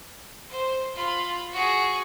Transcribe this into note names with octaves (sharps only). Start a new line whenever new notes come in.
C5
F4 B5
F#4 G#4